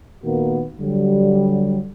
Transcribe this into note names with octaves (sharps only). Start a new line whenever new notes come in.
A#2 D#3 A#3 B3 F#4
D3 F#3 G3